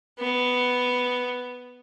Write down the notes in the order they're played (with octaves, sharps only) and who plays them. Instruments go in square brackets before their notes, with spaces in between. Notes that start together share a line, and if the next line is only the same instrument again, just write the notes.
[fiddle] B3